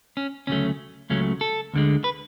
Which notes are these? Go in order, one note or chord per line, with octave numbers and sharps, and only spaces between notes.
C#4
D2 C#3 F#3 A3 C#4
C#2 C#3 F#3 A3 C#4
A4
D2 D3 G#3
B4